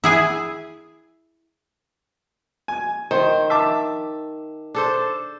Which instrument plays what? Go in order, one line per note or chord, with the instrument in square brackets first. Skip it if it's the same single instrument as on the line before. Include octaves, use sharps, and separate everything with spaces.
[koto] E4 G#4 G#5
[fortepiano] G#5
[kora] D#3 [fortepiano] C5
[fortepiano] E5 A5 D6
[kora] D4 A4 C5